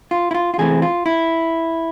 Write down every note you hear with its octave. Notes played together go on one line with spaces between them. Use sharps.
F4
E4
F4
F4
E2 C3 E3 A3 C4 G#4
F4
E4